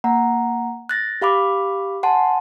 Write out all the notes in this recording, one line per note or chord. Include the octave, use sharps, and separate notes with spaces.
A#3 F#5 A#5
F#6 A6 A#6
G4 F5 B5 D6
F#5 G#5 A5 C6